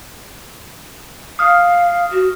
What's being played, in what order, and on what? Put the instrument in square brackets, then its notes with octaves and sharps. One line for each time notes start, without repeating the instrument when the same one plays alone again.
[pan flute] F5 [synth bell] D#6 F6
[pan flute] F#4